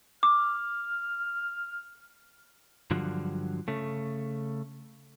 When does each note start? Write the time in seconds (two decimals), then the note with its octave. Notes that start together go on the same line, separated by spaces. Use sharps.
0.23 D6 F6
2.91 G2 D3 F3 F#3
3.68 C#3 A3